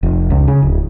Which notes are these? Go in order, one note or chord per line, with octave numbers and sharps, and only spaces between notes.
F1
C#2
C#3
D1